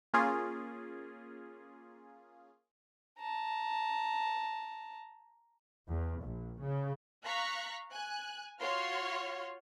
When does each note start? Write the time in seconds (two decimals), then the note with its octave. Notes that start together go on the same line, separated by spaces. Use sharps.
0.14 A#3 C#4 F4 G#4
3.20 A5 A#5
5.88 E2
6.23 A#1
6.61 C#3
7.24 F5 A#5 C#6 F#6 B6
7.92 G#5 F#6
8.60 F4 F#4 C#5 C6 F6